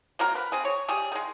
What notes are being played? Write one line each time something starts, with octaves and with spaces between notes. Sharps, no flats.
F#3 A#3 C4 A#4
B4
C4 G#4
C#5
G3 G4 G#4
D#3 G#3